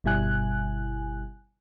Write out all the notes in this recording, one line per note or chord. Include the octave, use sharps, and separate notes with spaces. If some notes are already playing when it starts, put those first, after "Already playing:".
G1 B2 G3 E4 G#5 F#6